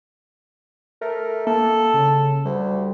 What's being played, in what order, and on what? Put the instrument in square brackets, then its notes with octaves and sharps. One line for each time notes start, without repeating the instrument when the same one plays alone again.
[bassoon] A3 [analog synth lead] A#4
[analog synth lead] A#3 [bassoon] A4
[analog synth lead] C#3
[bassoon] D2 [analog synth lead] G3